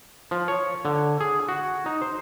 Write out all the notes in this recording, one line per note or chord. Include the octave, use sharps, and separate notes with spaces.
F3
C#5
D3
G#4
F#4
D#4
C5